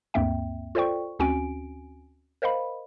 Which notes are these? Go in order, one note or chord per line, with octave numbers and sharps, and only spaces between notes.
D2 G2 A#3 C4 E5 G5
F4 A4 C5 D5 G5 C#6
D2 C4 C#4 F#4 G#5 D7
A#4 C5 D#5 F5 B5